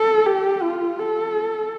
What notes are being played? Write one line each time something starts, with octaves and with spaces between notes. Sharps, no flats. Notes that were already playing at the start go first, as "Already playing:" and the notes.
Already playing: A4
G4
F4
A4